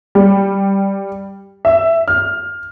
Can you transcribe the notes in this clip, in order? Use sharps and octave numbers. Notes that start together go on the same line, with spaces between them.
G3
E5
F6